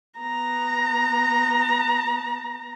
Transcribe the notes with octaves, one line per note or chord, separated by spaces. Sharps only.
B3 A#5